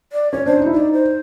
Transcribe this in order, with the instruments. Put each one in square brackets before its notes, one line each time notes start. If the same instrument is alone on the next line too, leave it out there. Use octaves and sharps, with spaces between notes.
[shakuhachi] D5
[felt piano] C#4 [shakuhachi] C#5
[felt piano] D4 [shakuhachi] C5
[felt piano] D#4
E4
[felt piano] D#4 [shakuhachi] D5
[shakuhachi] C5